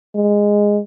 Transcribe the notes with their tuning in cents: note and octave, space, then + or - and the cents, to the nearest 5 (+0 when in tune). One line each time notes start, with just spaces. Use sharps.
G#3 -10